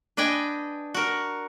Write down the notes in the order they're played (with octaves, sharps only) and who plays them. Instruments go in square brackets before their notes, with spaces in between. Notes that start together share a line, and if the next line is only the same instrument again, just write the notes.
[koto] D4 B4 D#5 G5 G#5
F#4 A#4